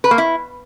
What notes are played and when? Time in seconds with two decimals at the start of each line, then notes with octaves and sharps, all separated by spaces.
0.04 B4
0.11 A#3
0.18 E4